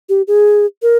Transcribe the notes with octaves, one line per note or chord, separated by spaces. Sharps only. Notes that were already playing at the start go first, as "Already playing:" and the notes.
G4
G#4
A#4